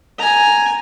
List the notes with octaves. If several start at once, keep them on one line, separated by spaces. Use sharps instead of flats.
G#5 A#5